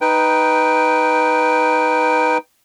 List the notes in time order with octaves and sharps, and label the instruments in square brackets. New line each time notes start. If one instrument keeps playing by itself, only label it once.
[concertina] D#4 B4 G5